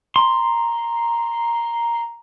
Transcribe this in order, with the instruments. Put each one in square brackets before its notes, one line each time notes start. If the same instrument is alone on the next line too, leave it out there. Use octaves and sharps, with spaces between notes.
[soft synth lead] A#5 [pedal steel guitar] C6